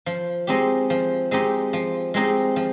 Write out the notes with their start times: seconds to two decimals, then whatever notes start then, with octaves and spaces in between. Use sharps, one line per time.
0.06 F3
0.47 G#3 C4 D#4 G4
0.90 F3
1.31 G#3 C4 D#4 G4
1.73 F3
2.14 G#3 C4 D#4 G4
2.56 F3